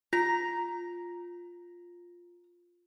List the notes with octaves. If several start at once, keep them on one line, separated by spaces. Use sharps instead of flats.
F4 A#5